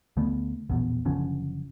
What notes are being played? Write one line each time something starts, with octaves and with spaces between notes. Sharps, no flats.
D2 D3 A3 B3
A#1 E2 B2
F#1 D3 F3 C#4